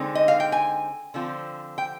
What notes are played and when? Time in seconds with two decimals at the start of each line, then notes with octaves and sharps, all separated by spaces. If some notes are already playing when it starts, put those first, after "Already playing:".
Already playing: D3 G#3 C4 D#4
0.15 D#5
0.28 F5
0.40 G5
0.52 G#5
1.14 D3 F3 C4 F4
1.78 G5